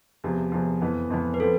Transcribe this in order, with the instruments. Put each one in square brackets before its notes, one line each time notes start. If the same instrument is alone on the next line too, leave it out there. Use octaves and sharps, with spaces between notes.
[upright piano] E2 C3 F3
E2 C3 F3
F2 E3 B3
F2 E3 B3
[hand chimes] B4
[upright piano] F3 C4 [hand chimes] A4